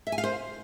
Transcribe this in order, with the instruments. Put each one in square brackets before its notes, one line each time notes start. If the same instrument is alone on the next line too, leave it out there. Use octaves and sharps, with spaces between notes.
[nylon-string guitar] E5
G#5
F5
C5